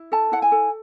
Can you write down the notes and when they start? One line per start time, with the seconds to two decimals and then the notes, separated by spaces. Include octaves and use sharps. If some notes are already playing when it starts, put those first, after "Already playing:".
Already playing: E4
0.12 A4 A5
0.32 E4 F#5
0.42 G#5
0.52 A4